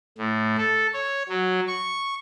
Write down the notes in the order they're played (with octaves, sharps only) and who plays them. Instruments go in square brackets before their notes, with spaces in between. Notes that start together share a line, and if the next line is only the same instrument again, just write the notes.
[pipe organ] A2
A4
C#5
F#3
C#6